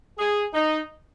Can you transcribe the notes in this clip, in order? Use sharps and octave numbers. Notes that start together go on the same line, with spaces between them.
G#4
D#4